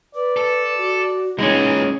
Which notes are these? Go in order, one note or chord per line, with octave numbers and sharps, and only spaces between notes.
B4 D5
A4
F#4
A#2 E3 G#3 C#4 D#4